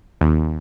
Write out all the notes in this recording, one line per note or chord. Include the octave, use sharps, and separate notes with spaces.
D#2